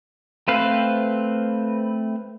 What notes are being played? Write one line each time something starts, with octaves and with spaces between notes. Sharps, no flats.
A3 C4 B4 C5 F5